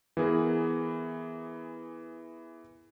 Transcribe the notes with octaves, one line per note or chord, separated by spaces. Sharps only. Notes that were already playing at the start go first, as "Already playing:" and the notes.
E3 B3 G#4 A#4